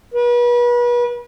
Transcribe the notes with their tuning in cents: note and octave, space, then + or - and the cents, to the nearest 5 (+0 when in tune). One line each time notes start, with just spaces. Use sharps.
B4 -35